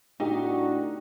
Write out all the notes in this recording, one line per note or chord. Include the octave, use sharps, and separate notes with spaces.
A2 A3 D4 D#4 F#4 G4